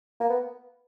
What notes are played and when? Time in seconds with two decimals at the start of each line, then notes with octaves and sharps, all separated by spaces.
0.20 A#3
0.29 B3